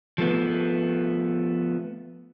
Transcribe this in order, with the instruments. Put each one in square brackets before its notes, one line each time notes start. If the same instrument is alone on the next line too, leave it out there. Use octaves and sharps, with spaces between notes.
[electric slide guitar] F3 A3 B3